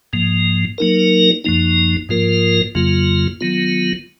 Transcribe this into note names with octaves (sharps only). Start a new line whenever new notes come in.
G#2 F3 A#3
F#3 A#3 D#4 A#4
F#2 F3 A#3 D#4
G#2 F3 A#3 F4 A#4
F2 C#3 F#3 A#3 F4
D#3 F#3 B3 F4